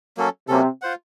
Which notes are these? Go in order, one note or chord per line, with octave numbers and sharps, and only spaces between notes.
F#3 A#3 C#4 A4
C3 F#3 A#3 C#4 A4
F4 C5 F#5